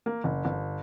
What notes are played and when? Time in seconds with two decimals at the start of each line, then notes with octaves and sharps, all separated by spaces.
0.06 A#3
0.24 F#1
0.45 G1